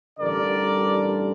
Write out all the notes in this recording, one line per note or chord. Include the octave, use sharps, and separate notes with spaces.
A1 G2 D3 G3 A#4 D5